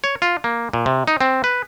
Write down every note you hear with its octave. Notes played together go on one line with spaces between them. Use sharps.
C#5
F4
A#3
A#2
C3
D#4
C4
B4